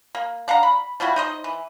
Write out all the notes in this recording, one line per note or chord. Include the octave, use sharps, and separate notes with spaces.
A#3
D4 F5 F#5 A#5
B5
F3 G3 E4 F#4
D#4 C5 D#5
E3